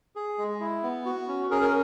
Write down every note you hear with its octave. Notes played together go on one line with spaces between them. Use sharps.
G#4
G#3
E4
B3
F#4
C#4
C#4 G#4 A#4
A#4